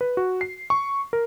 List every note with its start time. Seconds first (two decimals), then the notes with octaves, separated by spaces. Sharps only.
0.01 B4
0.17 F#4
0.41 C7
0.70 C#6
1.13 A#4